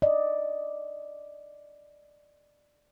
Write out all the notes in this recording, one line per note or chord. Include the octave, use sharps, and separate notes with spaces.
D5 D#5